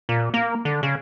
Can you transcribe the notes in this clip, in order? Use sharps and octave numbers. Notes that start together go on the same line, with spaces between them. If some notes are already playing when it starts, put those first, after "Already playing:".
A#2
A#3
D3
C#3